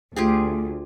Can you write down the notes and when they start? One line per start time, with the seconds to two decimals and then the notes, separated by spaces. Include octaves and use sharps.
0.16 D2 F4 G4 G#4